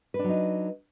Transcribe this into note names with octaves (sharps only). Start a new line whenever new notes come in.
F#3 D4 D#4 B4